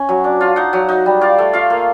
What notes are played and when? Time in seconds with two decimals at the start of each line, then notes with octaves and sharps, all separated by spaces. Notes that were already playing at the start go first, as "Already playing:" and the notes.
Already playing: C#4
0.09 F#3
0.24 D4
0.41 F4
0.56 D#4 F#5
0.73 F#3
0.89 D#4
1.06 G3
1.21 F4 D5
1.38 A3
1.53 F4 F5
1.70 A#3